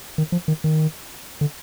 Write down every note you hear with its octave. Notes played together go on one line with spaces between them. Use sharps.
D#3
F3
D#3
D#3
D3